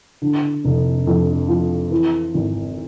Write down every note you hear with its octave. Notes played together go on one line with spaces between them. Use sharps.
D3
F1
F2
F3
E3
G#1